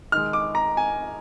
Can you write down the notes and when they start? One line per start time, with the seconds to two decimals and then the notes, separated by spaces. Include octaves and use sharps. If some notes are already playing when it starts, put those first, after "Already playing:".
0.12 D#3 G#3 F6
0.33 D6
0.55 A#5
0.77 G#5